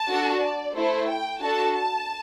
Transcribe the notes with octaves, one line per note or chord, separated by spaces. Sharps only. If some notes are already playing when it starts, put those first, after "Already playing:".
Already playing: A5
D4 F#4 A4
D5
A3 E4 A4 C5
G5
D4 F#4 A4 A5
A5